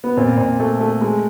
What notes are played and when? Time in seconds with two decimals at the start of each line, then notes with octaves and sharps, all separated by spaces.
0.04 B3
0.17 A#2 C4
0.37 A#2
0.60 A3
0.80 A3
1.01 G#3